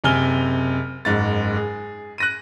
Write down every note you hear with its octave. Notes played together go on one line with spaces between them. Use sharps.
F#1 C3 G#5 F6 G7
F#1 G#2 A6
G#4
F#6 A#6 D#7